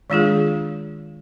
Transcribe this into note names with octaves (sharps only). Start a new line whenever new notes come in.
D#3 G#3 D4 F4 G#4